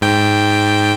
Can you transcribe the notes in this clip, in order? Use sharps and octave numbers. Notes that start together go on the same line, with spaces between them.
G#2 G5